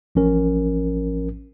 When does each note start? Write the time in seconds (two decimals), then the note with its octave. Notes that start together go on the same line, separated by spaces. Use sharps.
0.15 A1 F3 C#4 A#4